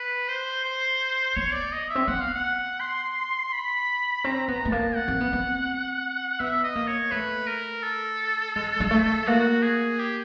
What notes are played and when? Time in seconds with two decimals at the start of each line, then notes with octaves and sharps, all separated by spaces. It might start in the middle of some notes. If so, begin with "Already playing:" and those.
Already playing: B4
0.28 C5
0.64 C5
1.36 B3 C#5
1.54 D5
1.73 D#5
1.90 E5
1.95 C4
2.08 B3 F#5
2.21 F5
2.34 F#5
2.81 C6
3.53 B5
4.24 C4 A#5
4.48 B3 A#5
4.65 A3
4.71 A#3 A5
4.96 F#5
5.08 C4
5.20 B3
5.33 C4
6.40 B3 E5
6.64 D#5
6.76 A#3
6.88 C#5
7.11 A3 B4
7.48 A#4
7.83 A4
8.56 G#3
8.80 G#3
8.91 A3
9.27 A#3 F#4
9.63 G#4
9.99 G4